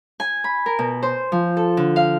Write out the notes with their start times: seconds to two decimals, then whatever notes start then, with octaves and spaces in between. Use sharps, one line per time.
0.20 G#5
0.44 B5
0.66 A#4
0.79 B2
1.03 C5
1.32 F3
1.57 A4
1.77 D3
1.96 F5